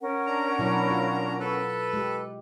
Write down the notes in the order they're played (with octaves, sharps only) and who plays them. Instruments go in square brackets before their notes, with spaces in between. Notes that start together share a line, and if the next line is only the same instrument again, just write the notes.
[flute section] C#4 A#4 F#5
[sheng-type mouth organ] D4 A#5
[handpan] B2 F#3 E4
F4
[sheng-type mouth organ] A4 B4
[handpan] G#3 G4